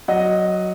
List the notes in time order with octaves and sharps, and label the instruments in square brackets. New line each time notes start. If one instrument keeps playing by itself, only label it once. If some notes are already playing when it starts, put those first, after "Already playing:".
[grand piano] F#3 D#5 F#5